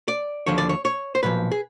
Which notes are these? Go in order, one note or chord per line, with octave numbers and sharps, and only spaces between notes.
D5
D#2 D3 F3 C#5
D5
C#5
C#5
C5
B1 A#2 F3 B4
G#4